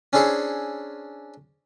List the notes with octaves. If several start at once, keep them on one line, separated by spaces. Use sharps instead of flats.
C#4 D4 E4 G#4 C5 C#5